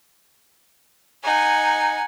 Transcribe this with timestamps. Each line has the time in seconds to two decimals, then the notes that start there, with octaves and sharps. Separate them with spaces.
1.24 D#4 F#5 G#5